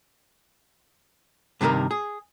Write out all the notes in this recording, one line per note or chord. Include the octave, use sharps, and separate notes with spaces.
G2 C3 D#3 G#4 A#4
G#4